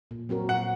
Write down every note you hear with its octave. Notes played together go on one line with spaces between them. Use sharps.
A#2
F#3 C4 F#4 A#4
A#2 F#5